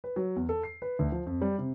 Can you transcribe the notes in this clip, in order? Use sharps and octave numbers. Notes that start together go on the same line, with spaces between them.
B4
F#3
E2
A4
C7
B4
D2
F3
F2
G3
C3